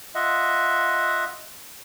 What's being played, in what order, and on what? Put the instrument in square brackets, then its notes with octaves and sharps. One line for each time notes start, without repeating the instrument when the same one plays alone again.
[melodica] F4 D#5 E5 F#5